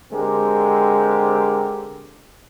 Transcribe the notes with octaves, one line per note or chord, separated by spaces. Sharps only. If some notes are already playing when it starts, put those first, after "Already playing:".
D3 G#3 C4 G4 A#4